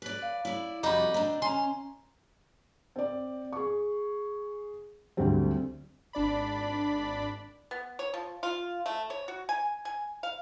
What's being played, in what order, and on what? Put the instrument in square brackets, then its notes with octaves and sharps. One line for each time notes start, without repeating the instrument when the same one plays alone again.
[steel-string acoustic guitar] B4 D5
[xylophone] F5
[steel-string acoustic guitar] E4 D5
[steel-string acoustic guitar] F2 G3 F#4 [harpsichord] D#4 B5 [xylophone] D6 G6
[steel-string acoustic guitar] C4 D4 [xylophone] D#5 A#5
[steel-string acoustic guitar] C#4 [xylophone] G#5 A#5 [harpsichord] C6
[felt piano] C4 D5
G#4 C#6
D2 D3 F#3 G3 C4
[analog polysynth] G#1 D4 D5 B5
[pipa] B3
C#5
F3
F4
A3
C#5
F#4
G#5
G#5
F5